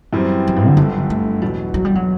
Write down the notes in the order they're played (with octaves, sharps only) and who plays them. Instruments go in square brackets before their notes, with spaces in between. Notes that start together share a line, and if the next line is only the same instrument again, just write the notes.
[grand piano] F#2 E3 G3 C4
[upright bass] F#2
G2
D3
[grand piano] G1 G2 D3 G3 [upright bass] F#3
[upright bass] A3
[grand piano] E2 B2 F#3 [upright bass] G3
[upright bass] F#3
G3
F#3